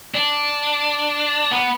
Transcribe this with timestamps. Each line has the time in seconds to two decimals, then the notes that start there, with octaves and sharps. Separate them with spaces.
0.15 D4
1.51 B3